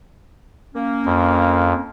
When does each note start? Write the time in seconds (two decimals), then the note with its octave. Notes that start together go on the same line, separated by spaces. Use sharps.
0.74 A#3 C#4
1.06 F2